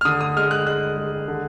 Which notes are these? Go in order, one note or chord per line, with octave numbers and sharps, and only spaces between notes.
F6
D3 D#6
D#6
G#3 F6
F#6
G#3 F#6
G#3
D3